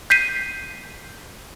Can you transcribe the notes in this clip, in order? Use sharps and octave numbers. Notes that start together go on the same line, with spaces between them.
G6 B6 C7 D#7